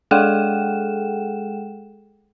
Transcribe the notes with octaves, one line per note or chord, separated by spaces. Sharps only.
G#3 G#4 A4 F#5 G5 E7